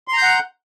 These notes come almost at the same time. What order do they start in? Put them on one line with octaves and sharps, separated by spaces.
C6 A#5 G6 F#5